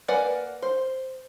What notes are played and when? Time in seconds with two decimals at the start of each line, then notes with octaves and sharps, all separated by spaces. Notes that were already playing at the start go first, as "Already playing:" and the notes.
0.08 A#3 B4 D5 F#5 G#5
0.62 C5